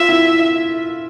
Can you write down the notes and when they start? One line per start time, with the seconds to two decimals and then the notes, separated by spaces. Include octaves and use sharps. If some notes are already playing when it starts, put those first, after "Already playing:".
Already playing: F4 E5
0.09 E4